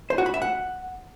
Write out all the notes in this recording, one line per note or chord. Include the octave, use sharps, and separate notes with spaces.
C5
F#4
B5
E5
F#5